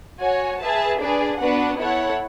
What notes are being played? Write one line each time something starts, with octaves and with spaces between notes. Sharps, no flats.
F#4 C#5 G#5
G#4 B4 E5 A5
D4 G#4 B4 D5
B3 D4 F#4 B4 F#5
E4 A4 C#5 F#5